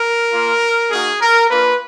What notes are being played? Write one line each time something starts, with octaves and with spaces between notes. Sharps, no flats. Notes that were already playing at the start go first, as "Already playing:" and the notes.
Already playing: A#4
A#3 F4
A#3 D#4 F#4 G#4
A#4
A#3 D4 F4 B4